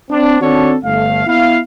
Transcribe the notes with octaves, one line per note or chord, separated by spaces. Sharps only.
C4 D4
D#3 C4 D4 F#4 A4 C#5
G1 A3 F5
B3 E4 F5